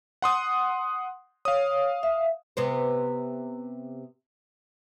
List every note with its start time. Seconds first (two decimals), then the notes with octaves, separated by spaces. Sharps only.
0.22 F#5 C6 D#6
1.45 C#5 F5 D#6
2.03 E5
2.57 C3 B3 C5